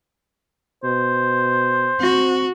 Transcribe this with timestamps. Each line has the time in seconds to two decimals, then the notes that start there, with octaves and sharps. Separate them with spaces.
0.84 B2 C5
2.00 C4 F#4